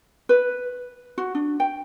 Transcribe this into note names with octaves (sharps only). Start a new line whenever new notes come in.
B4
F#4
D4
G5